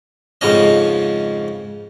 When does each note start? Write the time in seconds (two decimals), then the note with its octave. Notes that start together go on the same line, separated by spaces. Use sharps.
0.41 F2 G#2 C#3 F3 C#4 D#5